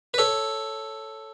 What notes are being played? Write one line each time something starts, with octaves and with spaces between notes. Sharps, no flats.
B4
A4 C#5